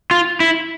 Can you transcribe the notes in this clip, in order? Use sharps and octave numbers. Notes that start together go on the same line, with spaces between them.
F4
E4